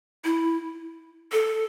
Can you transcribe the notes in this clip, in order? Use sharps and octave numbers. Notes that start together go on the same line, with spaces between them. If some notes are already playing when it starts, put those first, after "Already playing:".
E4
A4